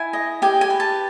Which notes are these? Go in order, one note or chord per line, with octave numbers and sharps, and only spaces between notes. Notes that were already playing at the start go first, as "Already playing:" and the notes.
Already playing: E4 G#5
D#5
G4 G#5
G#5
B4
A5